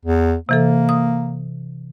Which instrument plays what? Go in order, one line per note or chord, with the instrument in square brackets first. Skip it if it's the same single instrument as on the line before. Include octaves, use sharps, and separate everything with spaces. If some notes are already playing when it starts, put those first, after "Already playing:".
[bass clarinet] E2
[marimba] C3 E3 A4 [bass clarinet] A#3
[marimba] D#6